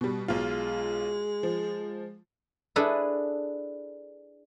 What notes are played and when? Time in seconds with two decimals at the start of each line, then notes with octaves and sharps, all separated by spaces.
0.01 B2 G3
0.28 B1 G#3 F4
1.43 F3
2.76 D4 E4 G#4 A4 B4